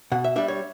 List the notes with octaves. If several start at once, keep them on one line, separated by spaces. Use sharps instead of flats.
B2 F#5
E5
G3 D4 E5
C#5